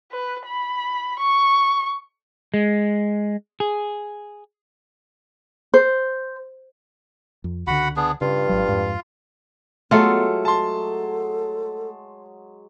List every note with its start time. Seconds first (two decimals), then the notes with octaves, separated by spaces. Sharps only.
0.12 B4
0.46 B5
1.19 C#6
2.54 G#3
3.60 G#4
5.74 C5
7.44 F2
7.67 C#2 D3 F#4 F#5 B5
7.96 B3 D4 G#4
8.21 G2 C#3 F4 F5
8.49 G#1 F#3
8.68 F2 G#2
9.91 F#3 G#3 A3 B3 F4 A4
10.45 A4 A5 C6